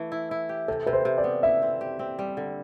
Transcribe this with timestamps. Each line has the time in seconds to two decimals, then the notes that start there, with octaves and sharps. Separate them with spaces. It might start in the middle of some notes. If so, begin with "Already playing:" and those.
Already playing: E3 A3
0.12 E4
0.31 E4
0.49 G4
0.68 C3 A4
0.86 C3 B4
0.93 C5
1.05 C3
1.18 D5
1.24 B3
1.43 E4 E5
1.62 C4
1.81 G4
1.99 C4
2.19 G3
2.37 D3